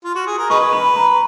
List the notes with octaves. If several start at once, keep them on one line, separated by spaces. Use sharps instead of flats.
F4
F#4
G#4
A#4
D#4 G#4 B4 C#6
B5
A#5